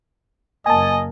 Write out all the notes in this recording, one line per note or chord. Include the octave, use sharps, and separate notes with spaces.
F#1 A#3 D#5 G#5 A5